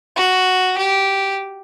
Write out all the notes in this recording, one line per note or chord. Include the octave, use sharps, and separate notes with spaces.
F#4
G4